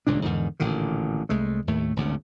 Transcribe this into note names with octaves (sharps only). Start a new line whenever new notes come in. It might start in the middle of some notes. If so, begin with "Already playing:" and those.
D#1 C#2 A#2 D4
E2 G#2 D3 D#3
A1 A#2 D3 D#3
C2 G#3 A3
D#2 A2 A3
G#1 D2 C#3